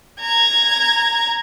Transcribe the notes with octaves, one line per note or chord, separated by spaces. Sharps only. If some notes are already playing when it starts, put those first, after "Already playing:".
A#5 G#6